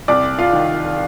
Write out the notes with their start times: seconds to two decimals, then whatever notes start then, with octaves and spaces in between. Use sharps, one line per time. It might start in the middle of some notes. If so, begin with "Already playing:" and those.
0.08 C2 D5 D6
0.39 F4 F5
0.53 D#3